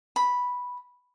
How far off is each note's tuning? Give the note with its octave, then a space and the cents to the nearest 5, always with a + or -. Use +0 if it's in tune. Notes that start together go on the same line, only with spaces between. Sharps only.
B5 -5